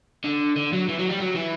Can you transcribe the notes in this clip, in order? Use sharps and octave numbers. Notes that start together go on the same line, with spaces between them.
D3
D3
F#3
E3
F#3
G3
F#3
E3